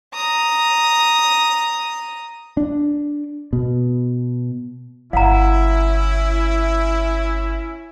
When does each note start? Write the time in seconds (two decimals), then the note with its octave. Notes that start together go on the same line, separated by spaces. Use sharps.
0.14 A#5 D#6
2.57 D4
3.53 B2
5.13 G1 C#4 E4 F5 F#5 A#5